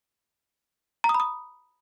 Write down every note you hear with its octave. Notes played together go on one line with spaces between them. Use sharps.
A#5
D#6
B5
D#6